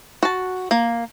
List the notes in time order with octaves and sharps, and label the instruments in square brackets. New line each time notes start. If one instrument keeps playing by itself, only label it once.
[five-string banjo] F#4 A5
A#3